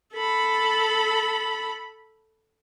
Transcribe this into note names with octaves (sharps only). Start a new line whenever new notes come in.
A4 B5